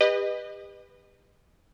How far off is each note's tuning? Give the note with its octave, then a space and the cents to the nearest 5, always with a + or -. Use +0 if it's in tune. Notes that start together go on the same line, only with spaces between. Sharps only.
G4 +30 B4 +0 D#5 -20